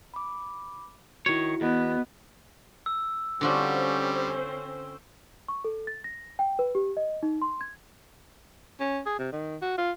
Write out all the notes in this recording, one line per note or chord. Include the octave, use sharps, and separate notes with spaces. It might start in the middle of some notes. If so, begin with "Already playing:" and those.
B5 D6
D#3 E4 F#4 C#5
E2 B3 F#4 D#5
E6
D3 G3 C4 C#4 F4 F#4 C5
C#6
A4
A6
A#6
G5
B4
G4
D#5
D#4
C6
G#6
C#4
G#4
C3
D#3
F#4
F4